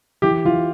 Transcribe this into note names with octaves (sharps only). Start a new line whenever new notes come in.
E3 G4
E3 F4